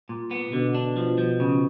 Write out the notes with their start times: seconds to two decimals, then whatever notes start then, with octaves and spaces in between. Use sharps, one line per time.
0.09 A#2
0.31 B3
0.53 B2 D3
0.75 D4
0.97 F3
1.18 F3
1.40 C#3